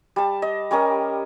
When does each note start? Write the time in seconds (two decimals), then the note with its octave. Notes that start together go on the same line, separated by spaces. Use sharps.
0.16 G3 A5
0.42 D#5
0.71 G3 C#4 A#4 D#6